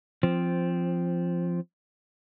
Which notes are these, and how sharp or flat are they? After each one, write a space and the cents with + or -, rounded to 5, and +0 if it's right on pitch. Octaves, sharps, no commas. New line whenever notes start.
F3 -10 C4 +5